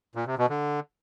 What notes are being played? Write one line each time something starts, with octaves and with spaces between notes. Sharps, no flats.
A#2
C3
B2
D3